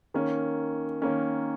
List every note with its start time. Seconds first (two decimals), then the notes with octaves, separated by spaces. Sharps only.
0.14 D#3 A#3 C#4
1.02 D#3 A#3 C#4